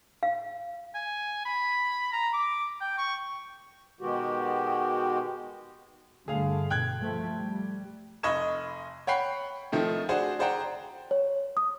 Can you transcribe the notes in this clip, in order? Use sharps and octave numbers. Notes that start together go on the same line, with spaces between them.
F5
G#5
B5
A#5
D6
G5
C#6
B2 D#3 G#3 B3 F#4 G4
G2 D3 A3 G#4 F5
B2 G5 F#6 G#6
F3 A3
G3
F1 D#5 B5 C#6 G#6 E7
C#5 F#5 G5 B5 C7
D#3 F3 A3 C4
D4 F#4 G#4 C5
G#4 C5 D5 F#5 G5 A#5
C#5
D#6